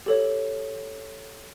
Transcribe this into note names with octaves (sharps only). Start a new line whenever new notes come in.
G4 A4 C#5